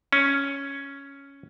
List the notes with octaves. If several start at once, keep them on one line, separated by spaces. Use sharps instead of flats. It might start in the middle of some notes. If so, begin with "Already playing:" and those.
C#4